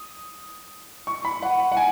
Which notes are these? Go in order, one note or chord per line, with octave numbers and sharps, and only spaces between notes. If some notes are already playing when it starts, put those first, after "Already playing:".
Already playing: D#6
C#6
B5
F#5
F#5
G#5